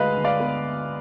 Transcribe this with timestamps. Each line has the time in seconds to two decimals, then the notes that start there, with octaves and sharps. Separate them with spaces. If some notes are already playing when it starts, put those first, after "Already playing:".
Already playing: D2 D3 G#3 B4 D#5 F5
0.16 D3
0.24 D5 F5
0.40 B3